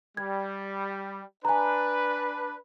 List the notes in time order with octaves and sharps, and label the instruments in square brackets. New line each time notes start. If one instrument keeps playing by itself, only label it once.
[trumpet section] G3 [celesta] G#6
[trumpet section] D4 B4 [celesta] G#5 A#5